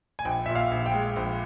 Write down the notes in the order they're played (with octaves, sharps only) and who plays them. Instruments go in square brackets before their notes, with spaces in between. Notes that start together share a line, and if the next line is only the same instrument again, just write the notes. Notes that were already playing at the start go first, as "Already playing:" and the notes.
[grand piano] G#5
A#1 G5
A#2 E5
F5
A#1
G5
G#3
A#1